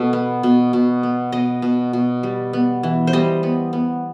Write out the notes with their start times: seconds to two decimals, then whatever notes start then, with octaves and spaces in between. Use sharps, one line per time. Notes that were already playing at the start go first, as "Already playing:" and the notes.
Already playing: B2 A4
0.13 B3
0.43 B2
0.73 B2
1.03 B3
1.32 B2 D#5
1.62 B2
1.93 B2
2.23 G3
2.53 B3
2.83 E3
3.07 C5
3.13 G3 D#5
3.43 B3
3.73 B3